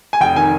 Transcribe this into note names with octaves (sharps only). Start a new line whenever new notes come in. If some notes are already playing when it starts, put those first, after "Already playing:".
G#5
F1 G5
D#3 G#5